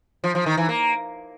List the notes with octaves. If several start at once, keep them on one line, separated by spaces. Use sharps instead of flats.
F3
F3
D#3
E3
A#3